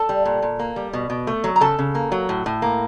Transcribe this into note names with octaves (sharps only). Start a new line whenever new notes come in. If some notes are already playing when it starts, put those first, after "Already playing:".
Already playing: A4 A5
G3
A#2
A#2
A#3
G3
B2
B2
A3
F#3
A#5
C#3 A4 A5
C#3
A#3
F#3
A2
A2
A#3